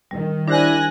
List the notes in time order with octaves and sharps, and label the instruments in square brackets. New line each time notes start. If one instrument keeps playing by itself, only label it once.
[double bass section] D#3 [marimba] G3
[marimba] D4 G4 C5 [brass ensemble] E4 D5 [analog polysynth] G#5 F#6 A#6